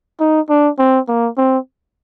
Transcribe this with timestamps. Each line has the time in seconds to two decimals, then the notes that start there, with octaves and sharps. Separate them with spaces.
0.20 D#4
0.49 D4
0.79 C4
1.08 A#3
1.38 C4